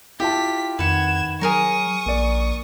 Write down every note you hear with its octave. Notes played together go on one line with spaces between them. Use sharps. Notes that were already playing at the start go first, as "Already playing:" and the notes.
E4 F4 G4 A5 B6
F2 D#3 B4 F#5 G#6 E7
F#3 G#4 A#4 A#5 C#6 D#6
A#1 A#3 D5